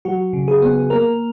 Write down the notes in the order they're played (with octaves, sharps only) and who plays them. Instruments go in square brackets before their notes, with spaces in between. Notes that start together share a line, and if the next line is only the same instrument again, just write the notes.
[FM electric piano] F#3 F#4
C#3
G#4
B3
A#3 A#4